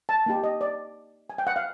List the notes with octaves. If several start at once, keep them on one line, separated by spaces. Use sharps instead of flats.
A5
A#3 D#4 G4
D#5
D5
G#5
G5
F#5
F5